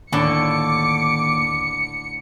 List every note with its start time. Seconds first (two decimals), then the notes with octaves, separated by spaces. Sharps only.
0.12 D#2 A2 D3 A5 D6 C#7